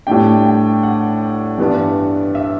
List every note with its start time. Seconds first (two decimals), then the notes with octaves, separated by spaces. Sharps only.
0.07 A2 G3 D4 G5
0.45 G5
0.83 F#5
1.58 G2 E3 B3 D4
2.35 E5